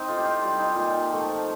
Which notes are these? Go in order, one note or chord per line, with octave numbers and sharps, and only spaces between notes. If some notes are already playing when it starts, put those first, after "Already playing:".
Already playing: C4 D#4
A2 F4
G4
F4
G3 F4
D#4
A#2 F4
F3 A3